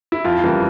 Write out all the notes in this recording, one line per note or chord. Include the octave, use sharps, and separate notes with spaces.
E4
F2 F4
C#3 E3 G3 A#3